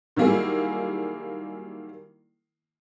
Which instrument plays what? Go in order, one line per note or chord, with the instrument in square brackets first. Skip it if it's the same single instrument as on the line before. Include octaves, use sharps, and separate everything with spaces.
[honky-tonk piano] D#3 F#3 G3 A#3 E4 G#4